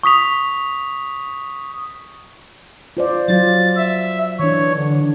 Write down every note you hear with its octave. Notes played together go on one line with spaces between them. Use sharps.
C#6 D#6 B6 F7
F4 C5 D5
F#3 F4 A6
E5
E3 D4 C#5
D3